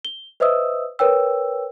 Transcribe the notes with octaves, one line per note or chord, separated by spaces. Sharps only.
G7
B4 C5 D#5 E5 D#6 E6
A#4 B4 C#5 G5 E6